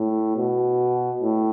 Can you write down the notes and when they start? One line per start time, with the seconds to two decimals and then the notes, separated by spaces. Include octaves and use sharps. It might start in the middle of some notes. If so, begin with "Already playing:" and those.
Already playing: A2
0.37 B2
1.22 A2